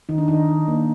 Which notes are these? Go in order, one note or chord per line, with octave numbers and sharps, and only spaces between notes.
D#3 D#4
D4
D#3 D#4
D#3
A#3